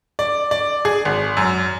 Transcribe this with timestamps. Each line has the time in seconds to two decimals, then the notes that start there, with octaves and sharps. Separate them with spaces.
0.19 D5
0.51 D5
0.85 G#4
1.05 G#1
1.37 F#2